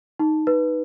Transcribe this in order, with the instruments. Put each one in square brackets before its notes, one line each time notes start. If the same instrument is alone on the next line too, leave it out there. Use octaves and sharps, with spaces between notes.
[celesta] D#4
B4